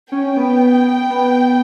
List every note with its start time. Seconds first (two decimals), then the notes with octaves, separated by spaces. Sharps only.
0.12 C#4 G5
0.37 B3
1.10 B3